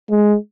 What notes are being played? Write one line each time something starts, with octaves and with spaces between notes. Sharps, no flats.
G#3